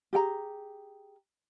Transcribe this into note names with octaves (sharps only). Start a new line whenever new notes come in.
G4 G#4 G5 A#5